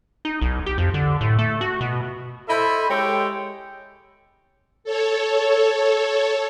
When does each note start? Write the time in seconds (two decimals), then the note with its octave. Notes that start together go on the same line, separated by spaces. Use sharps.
0.25 D#4
0.41 B1
0.66 G4
0.78 F2
0.94 D3
1.21 A2
1.39 A3
1.61 F#4
1.81 B2
2.48 E4 A4 C5 D#5 E5 B5
2.90 G#3 G4 A4 C#5 G5
4.84 A4 C#5